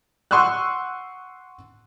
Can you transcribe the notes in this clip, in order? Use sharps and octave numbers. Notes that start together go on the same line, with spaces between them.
F#5 C6 C#6 D#6 E6 F#6